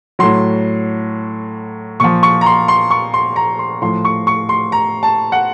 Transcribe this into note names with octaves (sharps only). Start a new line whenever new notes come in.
A2 F#3 C6
A#2 F3 C#6
C#6
A#5
C6
C6
C#6
C6
A#5
C6
A2 F3 C6
C#6
C#6
C6
A#5
A5
F#5